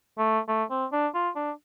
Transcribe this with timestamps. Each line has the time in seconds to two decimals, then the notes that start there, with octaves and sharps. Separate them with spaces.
0.19 A3
0.48 A3
0.70 C4
0.92 D4
1.14 F4
1.36 D4